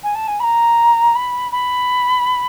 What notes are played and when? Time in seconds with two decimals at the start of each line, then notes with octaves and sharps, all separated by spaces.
0.04 G#5
0.15 A5
0.28 G#5
0.40 B5
0.43 A#5
1.15 B5
1.52 B5